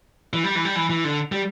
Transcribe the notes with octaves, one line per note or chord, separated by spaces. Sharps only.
E3
G3
E3
G3
E3
E3
D3
G3